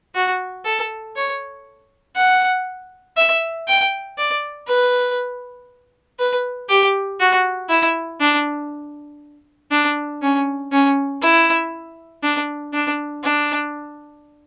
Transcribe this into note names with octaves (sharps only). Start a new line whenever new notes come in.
F#4
A4
C#5
F#5
E5
G5
D5
B4
B4
G4
F#4
E4
D4
D4
C#4
C#4
E4
D4
D4
D4